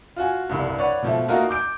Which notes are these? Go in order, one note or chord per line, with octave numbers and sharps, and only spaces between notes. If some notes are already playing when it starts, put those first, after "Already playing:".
F4 F#4 G#5
F1 C2 G2
B4 C#5 D5 F#5
B2 F3 A3
A3 A#3 D#4 F4 F#4 A#4
D6 G6 D7